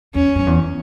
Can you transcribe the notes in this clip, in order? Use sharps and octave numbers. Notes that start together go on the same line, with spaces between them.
E2 C#4
F#2
E2